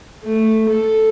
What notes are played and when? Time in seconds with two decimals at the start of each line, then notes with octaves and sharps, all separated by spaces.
0.24 A3
0.69 A4